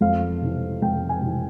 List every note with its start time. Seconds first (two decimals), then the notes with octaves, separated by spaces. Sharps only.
0.01 F2 F5
0.42 C3 E3
0.82 F2 G5
1.09 G#5
1.22 C3 E3